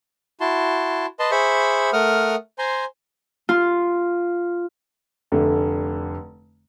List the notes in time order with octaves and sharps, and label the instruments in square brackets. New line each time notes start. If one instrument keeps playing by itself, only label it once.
[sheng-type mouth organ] E4 F#4 A5 C6
B4 D#5 A5 C6
G#4 C5 E5 B5 C#6
A3 A#4 F#5 D#6 F6
C5 G#5 A#5 C6
[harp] F4
[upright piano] F1 D3 A3